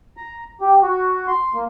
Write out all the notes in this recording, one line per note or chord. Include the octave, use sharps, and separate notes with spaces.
A#5
G4
F#4
C6
A#3